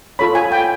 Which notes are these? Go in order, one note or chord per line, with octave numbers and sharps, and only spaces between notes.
F4 A4 C#5 B5
G#5
G5